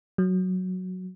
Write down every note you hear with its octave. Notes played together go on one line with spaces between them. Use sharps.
F#3